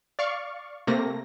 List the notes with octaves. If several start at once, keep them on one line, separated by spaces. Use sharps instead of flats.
D5 F5 C#6
C3 A3 A#3 A#6